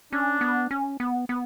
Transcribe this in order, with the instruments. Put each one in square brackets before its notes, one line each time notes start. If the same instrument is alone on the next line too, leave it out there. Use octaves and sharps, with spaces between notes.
[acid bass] C#4 [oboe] D4
[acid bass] B3
C#4
B3
B3